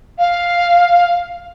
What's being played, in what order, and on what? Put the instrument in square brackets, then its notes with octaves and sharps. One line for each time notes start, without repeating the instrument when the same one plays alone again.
[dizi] F5